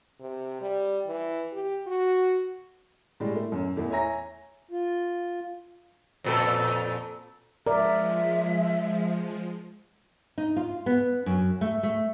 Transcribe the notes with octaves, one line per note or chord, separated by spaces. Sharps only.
C3
G3
E3
G4
F#4
A2 G3 G#3
A3
F#2
E2 A3
C#5 E5 G#5 A#5 A#6
F4
F2 A#2 A4
F3 G#3 A#4 D5 E5
D#4
F4
B3
F#2
A3
A3